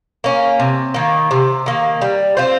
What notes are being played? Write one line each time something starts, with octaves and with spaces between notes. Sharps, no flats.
A#3 C#4
C3
D#3 A#3
C3
D#3 A#3
G3
C4 F4 C5